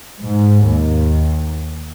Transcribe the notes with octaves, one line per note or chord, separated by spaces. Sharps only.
G#2
D#2